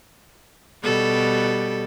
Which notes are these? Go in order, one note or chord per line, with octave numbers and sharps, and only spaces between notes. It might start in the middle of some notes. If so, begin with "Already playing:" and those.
B2 G3 A4